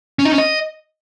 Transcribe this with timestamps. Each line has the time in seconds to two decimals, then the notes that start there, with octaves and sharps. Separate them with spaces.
0.19 C#4
0.25 D#4
0.32 C#4
0.38 D#5